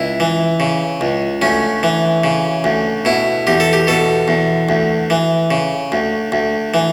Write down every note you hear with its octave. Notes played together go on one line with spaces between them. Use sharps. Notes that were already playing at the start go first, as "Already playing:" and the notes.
Already playing: C#2 E4
E3
C#3
C#2
D2 C#4
E3
C#3
D2
B2 E4
E2 G4
A4
G4
B2 A4
E2
D2
E3
C#3
D2
D2
E3